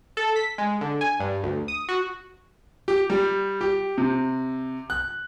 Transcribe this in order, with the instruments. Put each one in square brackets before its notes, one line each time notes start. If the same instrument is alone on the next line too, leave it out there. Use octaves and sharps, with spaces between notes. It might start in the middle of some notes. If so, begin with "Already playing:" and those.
[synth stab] A4
B6
G#3
D3
G#5
G2
D2
D#6
F#4
[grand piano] G4
G3
G4
C3
F#6